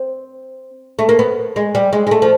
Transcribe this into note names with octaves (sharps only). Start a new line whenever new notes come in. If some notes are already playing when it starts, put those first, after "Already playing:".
Already playing: C4
A3
A#3
B3
G#3
G3
G#3
G#3
A3
F3